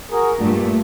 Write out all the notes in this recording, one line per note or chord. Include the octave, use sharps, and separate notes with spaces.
F#4 G#4 A#4
G2 A#2 A3